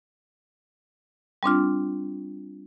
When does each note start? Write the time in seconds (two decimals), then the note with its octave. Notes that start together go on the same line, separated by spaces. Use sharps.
1.43 G3 C4 D4 F4